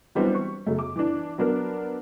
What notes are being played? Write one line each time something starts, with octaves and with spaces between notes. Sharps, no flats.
E3 F#3 G3 B3 C4 D4
C#6
F#2 C#3 A3
D6
E3 D4
F#3 B3 D4 A#4